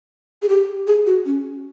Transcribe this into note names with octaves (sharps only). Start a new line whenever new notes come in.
G#4
G4
G#4
F#4
C#4